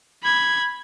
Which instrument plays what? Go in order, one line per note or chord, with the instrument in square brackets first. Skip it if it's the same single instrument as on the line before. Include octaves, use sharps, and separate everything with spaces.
[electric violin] B5 G#6